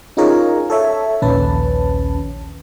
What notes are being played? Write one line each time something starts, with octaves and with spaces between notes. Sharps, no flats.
C#4 D#4 F4 G#4 A#4 C#5
A4 C#5 E5
A#1 D#2 C#4 B4 A5